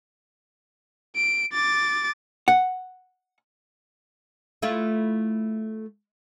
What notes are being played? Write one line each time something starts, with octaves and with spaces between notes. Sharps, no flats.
D7
D6 A6
F#5
A3 E4 F4